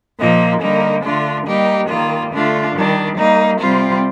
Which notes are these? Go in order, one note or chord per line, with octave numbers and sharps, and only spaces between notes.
A#2 F3 A#3 D#4
D3 G3 A#3 D#4
D3 A3 D4 F4
G3 A#3 D#4 G4
D#3 G3 A#3 F4
D3 A3 D4 F4
D#3 G3 D4
G3 A#3 D#4
C3 G3 C4 F4